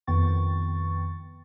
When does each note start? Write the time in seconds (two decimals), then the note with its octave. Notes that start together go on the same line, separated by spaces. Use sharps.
0.07 F2 D#3 B3 G5 C#6 A6